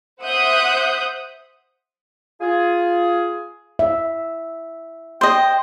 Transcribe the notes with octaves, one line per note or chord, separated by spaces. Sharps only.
C5 E5 F#5 D#6 F#6 G6
F4 G#4
E5
C5 D#5 G5